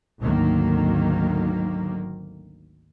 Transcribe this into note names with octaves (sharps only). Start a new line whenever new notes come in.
G#1 D2 D#3 F#3 A#3